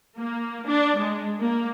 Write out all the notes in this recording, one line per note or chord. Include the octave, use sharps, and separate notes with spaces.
A#3
D4
G#3
A#3